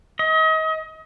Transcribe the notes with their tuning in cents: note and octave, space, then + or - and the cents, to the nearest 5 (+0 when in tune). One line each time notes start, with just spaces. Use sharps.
D#5 +35